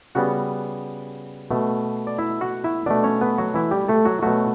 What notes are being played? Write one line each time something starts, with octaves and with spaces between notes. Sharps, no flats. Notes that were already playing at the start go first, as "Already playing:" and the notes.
C#3 G3 B3 F#4 F#5
B2 A3
D5
E4 E5
F#4 F#5
E4 E5
B2 A3 D4 D5
C#4 C#5
B3 B4
F#3 F#4
E3 E4
G3 G4
A3 A4
F#3 F#4
B2 F#3 A3 F#4